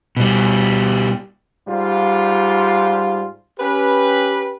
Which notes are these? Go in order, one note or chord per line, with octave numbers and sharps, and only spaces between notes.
B2 G3
G#2 G3 F4
C#4 G4 B4